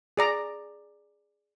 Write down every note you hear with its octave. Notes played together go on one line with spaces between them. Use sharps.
G#4 D5 A#5